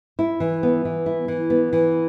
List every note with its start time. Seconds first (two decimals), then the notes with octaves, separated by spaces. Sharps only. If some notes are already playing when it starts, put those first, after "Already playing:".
0.19 E4
0.40 E3
0.63 B3
0.85 E3
1.06 E4
1.28 E3
1.50 B3
1.73 E3